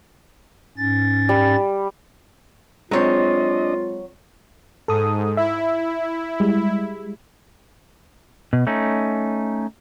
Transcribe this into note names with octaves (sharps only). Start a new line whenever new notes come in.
G#2 C#4 A6
G3
F#3 G#3 C4 D4 F4 C#5 D#5
G#2 A4 D#6
E4 E5
G3 G#3
B2
A3 C#4 D#4